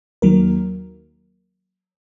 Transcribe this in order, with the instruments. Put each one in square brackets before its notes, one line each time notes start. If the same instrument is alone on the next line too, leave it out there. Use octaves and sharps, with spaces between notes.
[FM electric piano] D#2 D#3 F#3 A#3 A#4